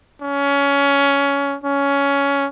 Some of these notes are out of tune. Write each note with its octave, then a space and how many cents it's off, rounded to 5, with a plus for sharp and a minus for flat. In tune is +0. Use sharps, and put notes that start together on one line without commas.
C#4 +20
C#4 +15